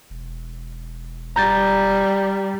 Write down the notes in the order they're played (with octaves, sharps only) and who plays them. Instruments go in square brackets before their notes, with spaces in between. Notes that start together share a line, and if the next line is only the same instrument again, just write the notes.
[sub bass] E1
[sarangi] G3 [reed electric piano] A#5 G6 A6